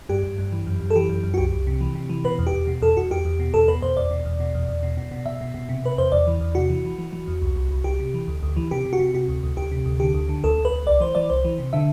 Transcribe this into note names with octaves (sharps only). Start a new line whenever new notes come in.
G2 G4
G2
G2
E3
F#2
F#2
A4
E3 G4
F#2
F#2
F#4
C2 G4
C2
C3
E3
C3
E3
B2 B4
E2
G4
E2
B2
E2 A4
E2 F#4
E2 G4
E2
B2
E2 A4
B2 B4
E2 C5
E2 D5
B2
E2
B2
E2
E2
B2
B2
B2
B2 E5
B2
B2
C3
C3 B4
E2 C5
E2 D5
E3
E2
C3 F#4
E3
E3
E3
E3
E2
C2
C2
C2
C2 G4
C3
E3
D2
D2
E3
C3 G4
C3
F#4
C3
C3 F#4
D2
D2
D2 G4
C3
D2
D3 G4
D2
D3
D2 A4
D2
B4
D2
C2 D5
E3 C5
E3 D5
C2 C5
E3
C3
D3 E5